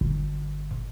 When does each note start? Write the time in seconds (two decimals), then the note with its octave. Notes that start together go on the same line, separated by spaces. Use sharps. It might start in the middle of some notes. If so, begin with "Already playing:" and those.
0.01 G1